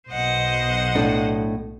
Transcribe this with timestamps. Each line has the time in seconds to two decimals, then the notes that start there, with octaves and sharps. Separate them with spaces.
0.11 B1 B2 C5 D#5 F#5
0.95 A2 D4 A4